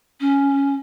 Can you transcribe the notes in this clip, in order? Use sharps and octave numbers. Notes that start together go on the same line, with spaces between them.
C#4